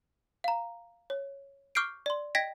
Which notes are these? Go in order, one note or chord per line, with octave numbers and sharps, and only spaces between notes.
F5 A#5
C#5
C#6 D6 F6 G6 C7 D7
D5 C6
D#5 G5 G#6 A#6 B6 D7